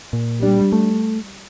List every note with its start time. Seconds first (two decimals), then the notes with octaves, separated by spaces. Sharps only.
0.13 A#2
0.41 G3 D4
0.72 A3